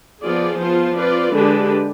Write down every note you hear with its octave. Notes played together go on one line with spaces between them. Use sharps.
F3 B3 F4 G#4 D5
F3 B3 F4 C5
C4 F4 B4 D5
D3 G#3 D4 G4 B4